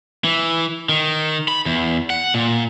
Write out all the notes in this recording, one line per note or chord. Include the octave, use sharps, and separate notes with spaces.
E3
D#3
B5
E2
F#5
A#2